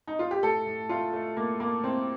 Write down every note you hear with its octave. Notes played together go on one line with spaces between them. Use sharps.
D#4
F4
G4
A2 A4
A2
A3 F4
A3
A2 A#3
A2 A#3
A2 C4